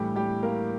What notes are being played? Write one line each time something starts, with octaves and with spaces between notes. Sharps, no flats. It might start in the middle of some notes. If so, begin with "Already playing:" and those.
Already playing: A2 E3 G3 A3 D4 G4
G3 G4
A#3 A#4